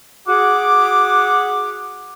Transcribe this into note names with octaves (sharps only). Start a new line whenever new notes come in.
F#4 G#4 F#5 D6